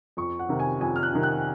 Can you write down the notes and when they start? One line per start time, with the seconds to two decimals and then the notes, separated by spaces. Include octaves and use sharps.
0.17 F2 C#6
0.39 F#5
0.49 C3 D#3
0.60 G#5
0.81 F2 G#5
0.96 F6
1.03 F#6
1.13 C3 D#3
1.23 F#6